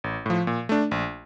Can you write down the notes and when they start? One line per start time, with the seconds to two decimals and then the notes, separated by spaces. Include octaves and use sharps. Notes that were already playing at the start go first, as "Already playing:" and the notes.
0.04 A1
0.26 A2 F3
0.47 A#2
0.69 A3 D4
0.91 A#1